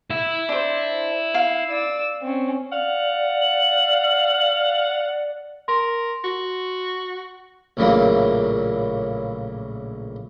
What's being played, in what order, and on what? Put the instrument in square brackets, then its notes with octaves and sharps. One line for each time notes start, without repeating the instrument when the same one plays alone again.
[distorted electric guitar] E4 E5
[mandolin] D4 C5
F5
[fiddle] D5 E6
C4 C#4
[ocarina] D5 [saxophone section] F5 F#5
[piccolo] F#7
[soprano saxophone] A#4 [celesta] C6
[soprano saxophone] F#4
[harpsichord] A#1 A2 C#3 E3 F#3 A#3